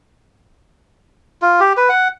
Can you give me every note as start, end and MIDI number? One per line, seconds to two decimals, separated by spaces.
1.42 1.60 65
1.60 1.73 67
1.77 1.89 71
1.89 2.08 78